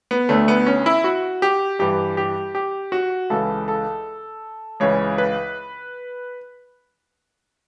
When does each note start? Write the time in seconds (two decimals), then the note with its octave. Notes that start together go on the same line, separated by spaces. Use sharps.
0.11 B3
0.29 D2 D3 A3
0.48 B3
0.67 C#4
0.86 E4
1.04 F#4
1.42 G4
1.79 G2 E3 G4
2.17 G4
2.55 G4
2.92 F#4
3.30 C#2 C#3 E3 A4
3.68 A4
4.80 C#2 C#3 E3 C#5
5.18 B4